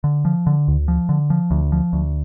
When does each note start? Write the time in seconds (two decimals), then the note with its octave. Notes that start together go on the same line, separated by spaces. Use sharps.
0.04 D3
0.25 F3
0.47 D3
0.68 D2
0.88 F3
1.09 D3
1.30 F3
1.51 D2
1.72 F3
1.93 D2